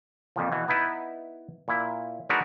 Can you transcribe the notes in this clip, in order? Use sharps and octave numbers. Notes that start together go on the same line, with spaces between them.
F2 A#2 F3
B2 E3
B3 D#4 E4 B4
A#2 E4
G#3 D4 D#4 F#4 A#4 B4